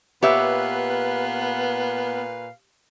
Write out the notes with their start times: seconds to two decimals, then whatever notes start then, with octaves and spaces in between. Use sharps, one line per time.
0.23 A#2 B3 G4 B4 C#5 E5 F5